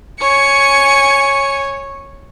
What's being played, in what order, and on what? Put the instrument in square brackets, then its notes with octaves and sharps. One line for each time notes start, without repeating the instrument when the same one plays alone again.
[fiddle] C#5 [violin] G#5 C#7